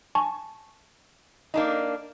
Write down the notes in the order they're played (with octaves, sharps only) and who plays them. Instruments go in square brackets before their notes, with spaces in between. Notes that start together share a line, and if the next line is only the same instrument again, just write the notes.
[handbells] G#5 A5 C#6
[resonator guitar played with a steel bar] A#3 D4 D#4